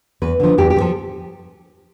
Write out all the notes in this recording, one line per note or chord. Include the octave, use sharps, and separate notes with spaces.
E2 B4
D3 F3
E2 G4
G4
D3
F3 A4